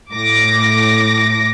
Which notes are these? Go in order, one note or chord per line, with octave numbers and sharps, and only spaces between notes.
A2 D6 A#6